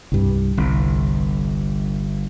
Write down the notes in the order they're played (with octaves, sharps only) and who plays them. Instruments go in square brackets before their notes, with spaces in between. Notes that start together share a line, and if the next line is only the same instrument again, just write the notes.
[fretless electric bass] C2 G2
[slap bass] G1 [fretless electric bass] C2